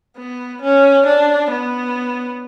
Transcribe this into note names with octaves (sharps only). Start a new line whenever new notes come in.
B3
C#4
D4
B3